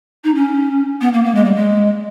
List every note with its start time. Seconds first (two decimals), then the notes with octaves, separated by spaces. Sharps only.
0.24 D#4
0.34 C#4
1.01 B3
1.13 A#3
1.24 A#3
1.34 G#3
1.44 G3
1.54 G#3